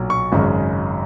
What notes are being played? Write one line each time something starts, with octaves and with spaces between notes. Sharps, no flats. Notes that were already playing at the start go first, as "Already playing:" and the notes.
Already playing: B1 A#2 F#3
C#6
G#1 F#2 C#3 G#3